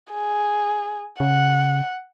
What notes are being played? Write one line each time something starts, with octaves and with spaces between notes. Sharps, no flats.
G#4
C#3 F#5